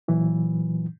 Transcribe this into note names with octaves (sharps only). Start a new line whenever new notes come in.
A#2 E3 F#3